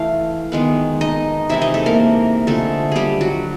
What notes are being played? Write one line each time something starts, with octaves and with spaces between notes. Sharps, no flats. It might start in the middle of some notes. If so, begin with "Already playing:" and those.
Already playing: E3 A3 F5
D#3 G#3 B3
D#4 D#5
C3 E3 G#3 E4 E5
D#4 D#5
A3 A4
A#3 A#4
D3 F3 G#3 A3 A4
G3 G4 G#4
F#3 F#4